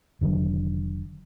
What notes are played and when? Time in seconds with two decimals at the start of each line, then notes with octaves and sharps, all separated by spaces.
0.21 F1 D3 D#3 F#3